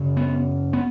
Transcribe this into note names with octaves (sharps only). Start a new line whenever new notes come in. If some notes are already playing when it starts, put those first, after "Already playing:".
Already playing: F#2 C#3
B3
B3